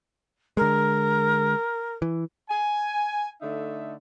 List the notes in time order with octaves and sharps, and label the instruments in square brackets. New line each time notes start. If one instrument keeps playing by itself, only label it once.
[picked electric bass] D3 G#3 [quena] A#4
[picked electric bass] E3
[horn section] G#5
D3 A3 D#4 E5